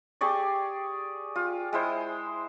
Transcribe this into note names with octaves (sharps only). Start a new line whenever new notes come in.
G4 G#4 D5 C#6
F4
G#3 E4 C5